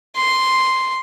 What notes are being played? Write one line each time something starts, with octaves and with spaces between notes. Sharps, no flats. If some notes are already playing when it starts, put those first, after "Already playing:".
C6